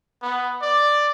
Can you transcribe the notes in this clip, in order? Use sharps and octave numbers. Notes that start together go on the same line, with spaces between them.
B3
D5